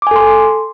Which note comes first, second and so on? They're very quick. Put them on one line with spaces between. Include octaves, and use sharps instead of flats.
D6 G#5 A4 C6